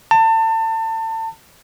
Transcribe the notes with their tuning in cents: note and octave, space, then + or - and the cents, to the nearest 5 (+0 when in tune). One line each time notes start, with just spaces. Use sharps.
A5 +30